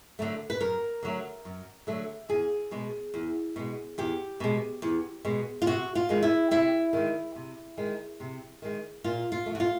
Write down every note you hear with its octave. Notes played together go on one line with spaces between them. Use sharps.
D3 F#3 A3
B4
F#2 A#4
D3 F#3 A3
F#2
D3 F#3 A3
E2 G#4
B2 G#3
E2
B2 G#3
E2 G4
B2 G#3
E2
B2 G#3
F4
C3 F#4
F4
D#3 G#3
E4
C3 E4
D#3 G#3
C3
D#3 G#3
C3
D#3 G#3
A#2 F4
F4
F3 A3
F#4
F4